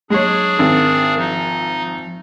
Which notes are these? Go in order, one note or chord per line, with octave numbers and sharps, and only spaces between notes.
F#3 G#3 D4 G#4 C#5
G#1 A#4
F3 D#4